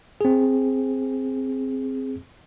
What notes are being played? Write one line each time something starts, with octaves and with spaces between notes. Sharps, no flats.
C4 G#4